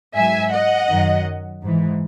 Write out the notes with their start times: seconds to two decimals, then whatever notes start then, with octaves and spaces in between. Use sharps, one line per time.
0.15 G#2 F#3 E5 G#5
0.52 D#5 F#5
0.88 F#2 D#3 F#3
1.61 G#2 E3